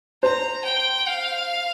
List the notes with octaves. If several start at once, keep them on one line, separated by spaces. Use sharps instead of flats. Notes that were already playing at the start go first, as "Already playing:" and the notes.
C5 A#5
G5
F5